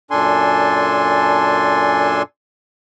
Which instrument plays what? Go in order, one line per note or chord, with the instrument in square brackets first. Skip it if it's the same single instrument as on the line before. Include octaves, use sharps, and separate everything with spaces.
[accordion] F#2 A#2 D4 A4 G#5 C6